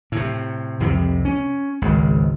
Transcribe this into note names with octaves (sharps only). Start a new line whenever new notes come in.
A2 C3
C2 F2 C3
C#4
G#1 C#2